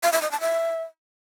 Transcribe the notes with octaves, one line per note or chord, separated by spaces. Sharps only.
F5
E5
D#5
A5
E5